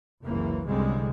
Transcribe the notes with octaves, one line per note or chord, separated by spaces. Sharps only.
F#1 C#2 C3 E3 A#3
C2 F#2 D3 G3 G#3 C4